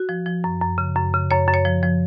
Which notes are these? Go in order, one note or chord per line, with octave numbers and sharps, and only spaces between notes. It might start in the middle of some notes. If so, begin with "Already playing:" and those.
Already playing: F#4
F3
F3
F#2
F#2
C#3
F#2
C#3
F#2 C#5
F#2
C#5
F3
F3